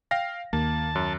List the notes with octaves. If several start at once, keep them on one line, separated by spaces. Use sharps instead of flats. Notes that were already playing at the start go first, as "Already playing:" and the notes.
F5 G5 A#6
D#2 A#3 A5
F#2